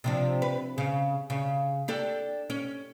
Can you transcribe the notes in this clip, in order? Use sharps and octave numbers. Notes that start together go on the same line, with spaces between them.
C3 F3 D4
B4
C#3
C#3
D4 G4 A4
C#4